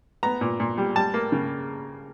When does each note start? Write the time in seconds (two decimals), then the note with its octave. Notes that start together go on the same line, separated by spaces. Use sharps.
0.23 B3 A#5
0.41 A#2
0.60 A#2
0.78 G3
0.96 G3 A5
1.14 A#3
1.32 C#3